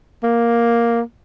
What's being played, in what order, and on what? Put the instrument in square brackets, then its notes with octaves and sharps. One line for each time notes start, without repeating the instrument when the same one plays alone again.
[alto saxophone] A#3